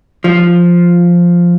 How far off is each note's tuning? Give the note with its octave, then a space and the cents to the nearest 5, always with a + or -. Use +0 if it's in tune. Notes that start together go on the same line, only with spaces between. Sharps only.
F3 +0